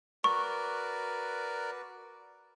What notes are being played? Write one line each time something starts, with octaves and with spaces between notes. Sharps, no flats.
F#4 A#4 B4 D5 C#6